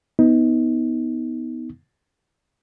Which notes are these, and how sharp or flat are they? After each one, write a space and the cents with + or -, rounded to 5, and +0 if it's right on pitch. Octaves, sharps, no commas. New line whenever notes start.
B3 +5 D#4 +25